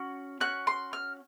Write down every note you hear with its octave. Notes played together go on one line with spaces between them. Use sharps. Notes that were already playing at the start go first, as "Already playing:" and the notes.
Already playing: C#4 F#4
C#4 F#4 F#6
C6
F6